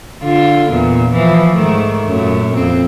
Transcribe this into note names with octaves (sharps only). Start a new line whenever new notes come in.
D3 F4
E2 A#2
E3 F3
G#2 D#3 A3
F#2 A#2 A3
F2 C4